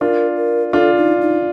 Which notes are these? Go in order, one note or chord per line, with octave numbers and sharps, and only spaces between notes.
D4 F4 A#4
A#4
D4 F4 A4
D#4
D#4